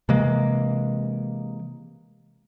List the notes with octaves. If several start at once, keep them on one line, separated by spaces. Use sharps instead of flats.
C3 E3 G#3 A#3